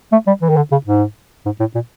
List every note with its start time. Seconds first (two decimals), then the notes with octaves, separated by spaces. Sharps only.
0.12 A3
0.27 G3
0.42 E3
0.49 D#3
0.56 D3
0.72 C#3
0.86 G#2
1.45 G#2
1.60 A2
1.75 A#2